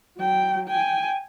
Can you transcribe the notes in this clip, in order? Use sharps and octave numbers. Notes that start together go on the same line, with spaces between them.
F#3 G5
G5 G#5